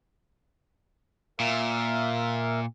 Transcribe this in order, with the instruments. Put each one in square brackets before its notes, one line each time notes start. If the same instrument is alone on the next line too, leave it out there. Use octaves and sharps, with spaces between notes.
[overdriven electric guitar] A#2 [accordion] A#4 E5 F5